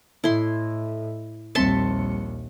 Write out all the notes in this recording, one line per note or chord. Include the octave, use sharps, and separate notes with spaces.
A2 E4 A4 D#5 E5 C6
A#1 D#2 G3 C4 E5 A5 C6 C#7